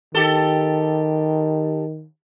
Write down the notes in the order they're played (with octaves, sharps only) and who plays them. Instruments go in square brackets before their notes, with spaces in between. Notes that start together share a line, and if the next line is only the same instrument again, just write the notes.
[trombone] D#3 [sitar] G4 A4